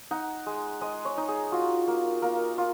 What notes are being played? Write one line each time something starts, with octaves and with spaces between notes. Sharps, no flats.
D#4 F#5
G#3
G#3 D#5
C#5
D#4
G#4
F4 F#4
A#3
A#3 A#4
F4